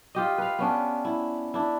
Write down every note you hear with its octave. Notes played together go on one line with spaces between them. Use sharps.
F4 G4 D#5
B4 F5
B3 C#4 D4
E4
D4 E4